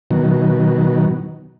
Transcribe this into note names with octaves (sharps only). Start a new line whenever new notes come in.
B2 D#3 F#3